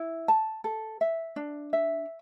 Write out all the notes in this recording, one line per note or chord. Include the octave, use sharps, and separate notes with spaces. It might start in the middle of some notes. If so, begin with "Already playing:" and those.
Already playing: E4
A5
A4
E5
D4
E5